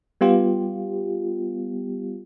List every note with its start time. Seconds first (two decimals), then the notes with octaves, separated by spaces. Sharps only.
0.21 G3 B3 F4 G4